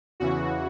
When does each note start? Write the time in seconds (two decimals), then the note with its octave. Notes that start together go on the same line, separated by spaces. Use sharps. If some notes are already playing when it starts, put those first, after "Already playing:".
0.20 E2 C#3 E3 F#4